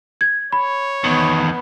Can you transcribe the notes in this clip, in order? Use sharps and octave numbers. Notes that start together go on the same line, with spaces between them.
G#6
C#5 B5
E2 D#3 B3